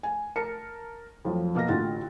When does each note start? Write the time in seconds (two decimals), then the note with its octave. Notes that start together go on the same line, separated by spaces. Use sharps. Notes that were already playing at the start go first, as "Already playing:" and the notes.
0.03 G#5
0.36 A#4 A5 C#7
1.25 F2 F3 F#3
1.55 B2 A#3 F6 A#6
1.68 A1 D3 F4 F#4 A6